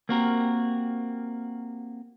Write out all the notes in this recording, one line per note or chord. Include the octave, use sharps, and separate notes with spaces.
A#3 C4 F#4 G4 A#4